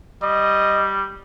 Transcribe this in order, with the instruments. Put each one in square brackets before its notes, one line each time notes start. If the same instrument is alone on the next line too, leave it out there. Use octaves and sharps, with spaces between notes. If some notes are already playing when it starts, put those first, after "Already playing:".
[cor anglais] G3 [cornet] D#5